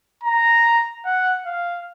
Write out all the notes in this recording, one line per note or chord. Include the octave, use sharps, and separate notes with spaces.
A#5
F#5
F5